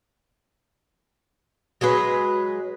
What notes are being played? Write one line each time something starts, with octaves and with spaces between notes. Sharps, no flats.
F#3 G#3 G#4 B4